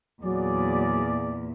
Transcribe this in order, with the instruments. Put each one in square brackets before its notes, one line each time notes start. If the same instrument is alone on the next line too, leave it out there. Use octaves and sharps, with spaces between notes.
[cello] E2 A#2 [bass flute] F#3 [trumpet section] G#4 D5